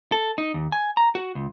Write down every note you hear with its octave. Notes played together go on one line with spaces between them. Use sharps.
A4
D#4
D#2
G#5
A#5
F#4
C#2